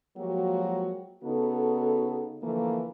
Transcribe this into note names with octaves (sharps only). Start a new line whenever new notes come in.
F3 F#3 G#3 A#3 F#4 G4
C#3 B3 D#4 F#4 A4
D3 E3 F3 A3 A#3